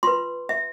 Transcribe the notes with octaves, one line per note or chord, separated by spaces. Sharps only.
F4 B4 C6
E5